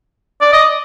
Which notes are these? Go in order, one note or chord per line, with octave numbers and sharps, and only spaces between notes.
D5
D#5